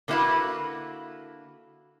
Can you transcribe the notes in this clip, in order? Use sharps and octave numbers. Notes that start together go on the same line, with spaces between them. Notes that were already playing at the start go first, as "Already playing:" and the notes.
D3 A#3 B3 E4 F#4 B4